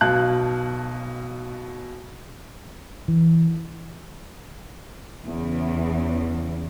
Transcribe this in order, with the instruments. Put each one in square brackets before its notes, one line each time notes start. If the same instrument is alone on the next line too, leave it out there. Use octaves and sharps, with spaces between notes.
[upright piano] B1 B2 F5 A5 F#6
[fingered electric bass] E3
[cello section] E2 C#3 E3